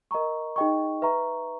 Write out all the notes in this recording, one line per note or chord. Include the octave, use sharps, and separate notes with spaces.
A#4 D#5 A#5 C#6
D#4 G#4 D#5 G5 C#6
B4 E5 A#5 C#6